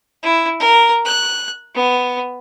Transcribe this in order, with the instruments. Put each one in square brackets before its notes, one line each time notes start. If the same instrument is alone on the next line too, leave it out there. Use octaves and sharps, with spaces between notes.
[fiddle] E4
A#4
F#6
B3